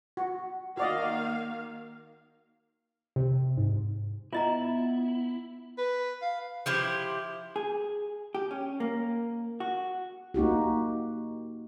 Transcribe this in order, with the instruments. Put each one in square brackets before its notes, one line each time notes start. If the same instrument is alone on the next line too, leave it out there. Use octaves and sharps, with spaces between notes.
[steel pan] F#4
[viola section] D#3 A#3 F5 [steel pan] F#4 D5 D#5
[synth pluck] C3
G#2
[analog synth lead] B3 [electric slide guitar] E4 [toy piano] F4 D#5 A#5
[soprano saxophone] B4
F5
[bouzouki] F3 E4 G4 C5
[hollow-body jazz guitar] G#4
G4
C#4
A#3
F#4
[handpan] A#3 D#4 F#4 G4